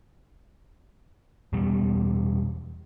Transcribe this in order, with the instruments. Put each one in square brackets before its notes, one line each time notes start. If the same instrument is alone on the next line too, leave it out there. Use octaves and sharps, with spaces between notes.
[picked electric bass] E2 B2 G3